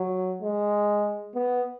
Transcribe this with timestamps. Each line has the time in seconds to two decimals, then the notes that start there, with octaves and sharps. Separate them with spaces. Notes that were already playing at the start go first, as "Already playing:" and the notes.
Already playing: F#3
0.42 G#3
1.35 B3